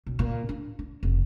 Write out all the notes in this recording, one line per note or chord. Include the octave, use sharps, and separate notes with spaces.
B1
A#2
D4
D4
F1